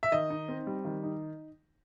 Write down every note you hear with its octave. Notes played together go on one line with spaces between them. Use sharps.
E5
D#3 D#5
D#4
C4
G3
D#3
D#4